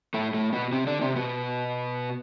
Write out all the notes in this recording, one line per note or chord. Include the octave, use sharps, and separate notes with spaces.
A2 A3
A2 A3
B2 B3
C3 C4
D3 D4
C3 C4
B2 B3